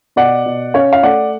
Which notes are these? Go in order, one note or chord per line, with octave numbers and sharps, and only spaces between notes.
B2 D5 F#5
B2
C#4 C#5 F5
F5
A3 D5 F#5